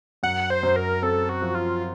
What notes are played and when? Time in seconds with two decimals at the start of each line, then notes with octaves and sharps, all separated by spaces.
0.23 F#2 F#5
0.50 C5
0.63 F#2
0.76 A#4
1.02 C4 A4
1.29 F#4
1.42 F3
1.55 F4